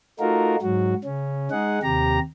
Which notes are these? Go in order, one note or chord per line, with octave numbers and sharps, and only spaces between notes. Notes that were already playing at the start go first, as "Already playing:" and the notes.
A3 D#4 F4 F#4 A#4
G#2 F#3 F#4
C#3 C#4
G#3 D#4 G#4 F#5
D#2 C3 G4 A#5